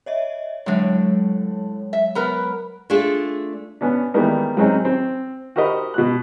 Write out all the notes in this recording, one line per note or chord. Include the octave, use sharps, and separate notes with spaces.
C#5 D#5 E5
A2 D3 F#3 G#3 C#5
E5
B3 A#4 B4
A3 D4 F4 G#4 A4
B3 C#4 D4
D#3 E3 G3 G#3 A#3 B3
F#3 G#3 C4 C#4 D#4
C4
F#4 G4 A#4 C5 D#5 B5
B2 F#4 F#6